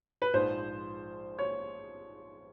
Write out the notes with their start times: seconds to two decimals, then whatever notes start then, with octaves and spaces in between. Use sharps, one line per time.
0.22 B4
0.33 A#1 G#2 F3 C5
1.39 C#5